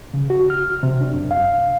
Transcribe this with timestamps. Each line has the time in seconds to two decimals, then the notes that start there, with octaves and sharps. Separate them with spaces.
0.14 C#3
0.30 F#4
0.50 F6
0.83 C3
1.01 D4
1.14 F#2
1.31 F5